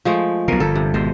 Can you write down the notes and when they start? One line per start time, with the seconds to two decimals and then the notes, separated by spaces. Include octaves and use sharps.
0.05 F3 G#3 A3
0.48 B1 B2 A#4
0.60 G1 G2 A4
0.75 C3
0.94 G#1 B2 G#3 C5